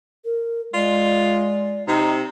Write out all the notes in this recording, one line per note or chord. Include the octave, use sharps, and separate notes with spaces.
A#4
G#3 F4 D5
C3 D#4